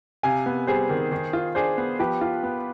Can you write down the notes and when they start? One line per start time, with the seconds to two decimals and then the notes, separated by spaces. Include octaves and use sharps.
0.23 C3 F5 G#5
0.46 B3
0.67 G3 G#4 C5
0.89 D#3
1.12 D#3
1.33 F4
1.55 D4 G#4 C5
1.77 B3
1.99 F3 G4 B4
2.21 F4
2.43 B3